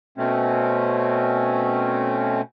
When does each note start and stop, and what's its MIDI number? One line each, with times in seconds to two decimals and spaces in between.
0.18 2.41 47
0.18 2.41 57
0.18 2.41 60
0.18 2.41 61